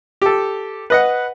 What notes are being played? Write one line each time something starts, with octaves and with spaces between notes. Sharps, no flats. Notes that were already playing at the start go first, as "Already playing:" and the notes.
G4 A4
B4 D#5 F#5